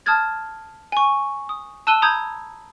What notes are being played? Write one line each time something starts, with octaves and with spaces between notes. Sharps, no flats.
A5 D#6 F6 F#6 G#6 A6
G#5 C#6
D#6
A5 E6 F#6 D#7 G7
A#5 B5 D#6 G6 G#6